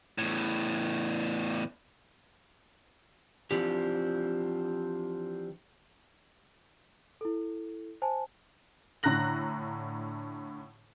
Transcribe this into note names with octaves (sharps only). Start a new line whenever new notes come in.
E2 A2
E3 F3 C4 D4 G4
E4 A4
C5 G#5 A5
A2 D3 A#5 F#6 A#6 F#7